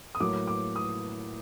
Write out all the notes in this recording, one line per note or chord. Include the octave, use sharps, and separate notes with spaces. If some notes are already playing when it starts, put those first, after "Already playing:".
D#6
A2 F#3 A#3 D6
D6
D#6